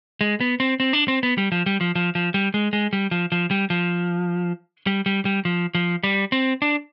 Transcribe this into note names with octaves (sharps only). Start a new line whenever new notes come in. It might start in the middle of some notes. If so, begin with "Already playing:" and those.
G#3
B3
C4
C4
D4
C4
B3
G3
F3
G3
F3
F3
F3
G3
G#3
G#3
G3
F3
F3
G3
F3
G3
G3
G3
F3
F3
G3
C4
D4